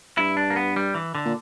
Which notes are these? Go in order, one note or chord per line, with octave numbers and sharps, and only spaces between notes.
G2 E4
D4
A#3
B3
G3
E3
D3
A#2